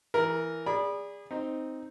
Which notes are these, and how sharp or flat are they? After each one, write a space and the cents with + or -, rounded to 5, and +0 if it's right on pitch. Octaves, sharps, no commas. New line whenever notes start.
E3 +0 A#4 +0 A#5 +45
G#4 -30 D5 -10 B5 -20
C4 +0 D#4 +0